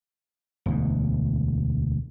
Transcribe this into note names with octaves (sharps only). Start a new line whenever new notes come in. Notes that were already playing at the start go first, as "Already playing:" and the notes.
E1 D2 G#2